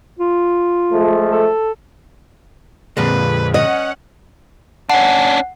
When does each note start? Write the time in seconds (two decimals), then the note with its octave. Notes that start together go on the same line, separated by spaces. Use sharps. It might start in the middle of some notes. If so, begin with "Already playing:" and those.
0.19 F4
0.91 F3 G#3 A3
1.31 A4
2.97 F2 A#2 D3 G#3 B4
3.54 C#4 D#5 F#5
4.90 C#4 D4 F#5